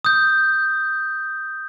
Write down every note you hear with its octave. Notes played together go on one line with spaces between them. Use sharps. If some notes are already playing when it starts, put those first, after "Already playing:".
D#6 G6